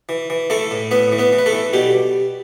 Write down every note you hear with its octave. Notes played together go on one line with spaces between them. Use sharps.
E3
E3
E3 A3 A4
A2
A2 B3 B4
E3
B3 B4
E3
B4
A3 A4
E3
B2 G3 G4